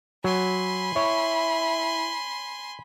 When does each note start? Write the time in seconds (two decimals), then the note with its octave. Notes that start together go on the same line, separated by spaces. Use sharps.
0.24 F#3 G#5 B5 C6
0.96 E4 C#5